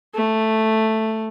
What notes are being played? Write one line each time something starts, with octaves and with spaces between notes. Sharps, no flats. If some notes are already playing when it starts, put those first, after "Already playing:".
A3